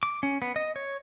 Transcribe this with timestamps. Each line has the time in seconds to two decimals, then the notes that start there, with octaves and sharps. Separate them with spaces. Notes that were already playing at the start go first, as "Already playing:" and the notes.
0.03 D6
0.23 C#4
0.42 B3
0.56 D#5
0.76 C#5